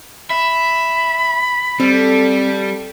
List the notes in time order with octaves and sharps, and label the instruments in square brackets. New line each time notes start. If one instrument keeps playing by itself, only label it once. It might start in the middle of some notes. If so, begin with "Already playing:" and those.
[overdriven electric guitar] E5 [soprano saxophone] B5
[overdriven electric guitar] G3 [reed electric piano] C4 [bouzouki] A4